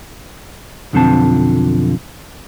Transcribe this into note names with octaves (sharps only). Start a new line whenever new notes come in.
B1 F2 D3 F3 C4 A5